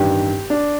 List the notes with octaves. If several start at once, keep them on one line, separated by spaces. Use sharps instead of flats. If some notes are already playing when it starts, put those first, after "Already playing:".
Already playing: A1 G2 D#3 G4
D4